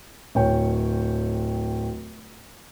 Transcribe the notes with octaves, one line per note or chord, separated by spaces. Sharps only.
D1 C#5 G5